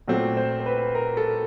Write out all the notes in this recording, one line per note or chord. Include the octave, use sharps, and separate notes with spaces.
A#2 F#3 A3 C4
C5
C5
B4
A#4
A4